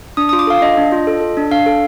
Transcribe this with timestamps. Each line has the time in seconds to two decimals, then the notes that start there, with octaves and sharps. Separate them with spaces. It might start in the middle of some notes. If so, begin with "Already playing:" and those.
0.17 D4 D#6
0.29 F4 D#6
0.39 D6
0.47 A4 F5
0.62 D4 D#5
0.77 D4
0.92 F4
1.07 A4
1.21 A4
1.37 D4
1.51 D4 F5
1.66 A4